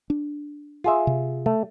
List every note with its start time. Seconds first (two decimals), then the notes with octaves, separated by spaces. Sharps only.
0.10 D4
0.84 F4 G#4 E5
1.07 C3
1.46 A3